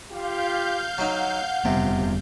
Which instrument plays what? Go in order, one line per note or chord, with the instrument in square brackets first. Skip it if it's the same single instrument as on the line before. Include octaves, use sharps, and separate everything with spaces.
[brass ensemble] F4 G4 [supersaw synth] F5 G6
[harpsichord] F#3 D#4 [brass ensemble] F#5
[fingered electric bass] F1 G3 B3 [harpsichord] C3